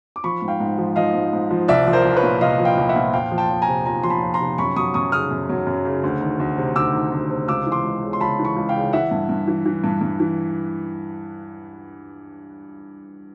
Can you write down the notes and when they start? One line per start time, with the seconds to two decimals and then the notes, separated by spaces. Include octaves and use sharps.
0.16 D6
0.24 F3 B5 C#6
0.42 G#2
0.48 F5 G5
0.60 G#2
0.78 F3
0.96 F3 D#5 F5
1.14 G#2
1.33 G#2
1.51 F3
1.68 C2 D5 E5
1.87 F3
1.93 A#4 C5
2.05 C2
2.17 B4 C#5
2.23 A#2
2.41 C2 D#5 F5
2.59 F3
2.65 F5 G5
2.77 C2
2.89 E5 F#5
2.96 A#2
3.13 F2 F5 G5
3.32 F3
3.38 G5 A5
3.50 F2
3.62 G#5 A#5
3.68 C3
3.86 F2 G#5 A#5
4.03 F3 C6
4.10 A5 B5
4.22 F2
4.34 A#5 C6
4.41 C3
4.58 F#2 B5 C#6
4.76 F#3 C#6 D#6
4.94 F#2 C#6 D#6
5.12 C#3 D#6 F6
5.31 F#2
5.49 F#3
5.67 F#2
5.85 C#3
6.04 D2
6.21 D#3
6.40 D2
6.58 C3
6.76 D2 D6 E6
6.93 D#3
7.12 D2
7.30 C3
7.48 C#2 D6 E6
7.67 E3
7.72 C6 D6
7.84 C#2
8.03 C#3
8.13 C6
8.21 C#2 A5 B5
8.39 E3
8.45 B5 C#6
8.56 C#2
8.69 F5 G5
8.75 C#3
8.93 E3 E5 F#5
9.11 G2
9.29 G2
9.48 E3
9.66 E3
9.84 G2
10.01 G2
10.20 E3